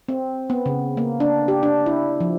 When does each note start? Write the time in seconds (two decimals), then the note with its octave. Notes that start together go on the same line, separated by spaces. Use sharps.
0.08 C4
0.50 B3
0.66 C#3
0.97 A#3
1.20 D4
1.48 G4
1.63 D4
1.86 E4
2.20 F3